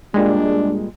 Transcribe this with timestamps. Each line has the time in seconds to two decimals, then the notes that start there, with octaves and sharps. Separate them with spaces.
0.14 A#2 G3 G#3 D4